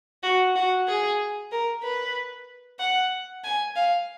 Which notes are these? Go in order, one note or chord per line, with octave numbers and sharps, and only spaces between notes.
F#4
F#4
G#4
A#4
B4
F#5
G#5
F5